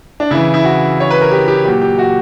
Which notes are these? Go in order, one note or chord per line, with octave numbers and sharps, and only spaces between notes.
D4
C#3 E3 E4
E4
F#4
C#5
B4
A#4
G4
G4
A#2 F#3 G4
G4
F#4